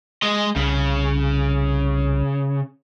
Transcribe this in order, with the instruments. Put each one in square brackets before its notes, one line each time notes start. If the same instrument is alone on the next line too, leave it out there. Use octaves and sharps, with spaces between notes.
[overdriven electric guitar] G#3 D#5
[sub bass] C2 [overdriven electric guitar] C#3